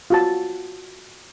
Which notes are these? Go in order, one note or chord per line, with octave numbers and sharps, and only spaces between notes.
F4 F#4 A5